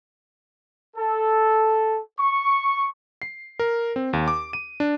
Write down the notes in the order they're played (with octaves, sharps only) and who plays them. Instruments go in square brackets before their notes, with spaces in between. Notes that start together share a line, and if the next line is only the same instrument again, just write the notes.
[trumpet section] A4
C#6
[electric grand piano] C7
A#4
C4
D#2
D6
D#7
D4